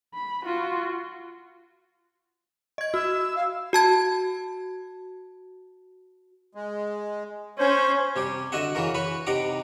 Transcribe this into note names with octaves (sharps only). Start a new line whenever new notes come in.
B5
F4 F#4
D#5 G#6
F#4 E6
F5
F#4 A5 G#6
G#3
C#4 C5
C3 G3 G4
D3 F#4 D#5 E5 F#5
C#3 E3 F#4 A#4
B4 C#5 B5
C3 D#4 G4 F#5 A#5 D6